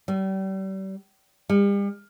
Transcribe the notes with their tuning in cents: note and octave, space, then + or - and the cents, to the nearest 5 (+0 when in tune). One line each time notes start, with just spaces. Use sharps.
G3 -35
G3 +40